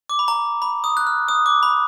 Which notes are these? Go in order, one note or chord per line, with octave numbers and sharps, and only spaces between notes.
D6
B5
A#5
B5
D#6
F#6
F6
D#6
D6
B5